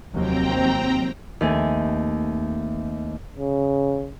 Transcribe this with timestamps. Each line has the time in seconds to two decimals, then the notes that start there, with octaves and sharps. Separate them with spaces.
0.12 F1 D#2 F#3 C4 G5 A#5
1.41 D#2 A3 C4 G#5
3.36 C#3